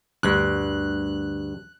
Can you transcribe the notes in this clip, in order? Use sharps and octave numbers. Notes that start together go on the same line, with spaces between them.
D2 G2 F#6